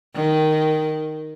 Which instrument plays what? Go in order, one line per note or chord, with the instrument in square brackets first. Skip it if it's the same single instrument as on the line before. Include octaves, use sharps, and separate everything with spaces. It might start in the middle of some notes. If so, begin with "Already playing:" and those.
[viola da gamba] D#3